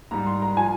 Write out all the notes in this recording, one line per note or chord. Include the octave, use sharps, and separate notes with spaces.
G#2 G3 A#5
C6
A#5
F3 G#5